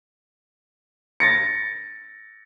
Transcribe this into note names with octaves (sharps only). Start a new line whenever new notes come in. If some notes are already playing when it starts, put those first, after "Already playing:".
A6 A#6 C#7